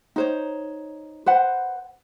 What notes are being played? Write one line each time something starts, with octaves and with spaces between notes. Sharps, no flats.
D#4 C5 C#5
B4 C5 F#5